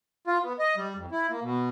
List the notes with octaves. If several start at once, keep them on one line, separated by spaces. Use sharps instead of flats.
F4
B3
D#5
G3
F2
E4
A#3
B2